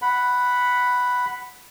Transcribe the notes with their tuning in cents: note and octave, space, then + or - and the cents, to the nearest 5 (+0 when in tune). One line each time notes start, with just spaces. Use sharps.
F#5 +0 B5 +0